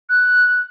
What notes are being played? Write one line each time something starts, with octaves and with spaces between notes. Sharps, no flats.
F#6